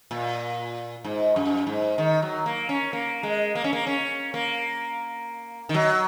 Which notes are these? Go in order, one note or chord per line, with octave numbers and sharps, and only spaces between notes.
A#2
G#2
F#2
G#2
D#3
F#3
A#3
C#4
A#3
G#3
A#3
C#4
A#3
C#4
A#3
D#3
F#3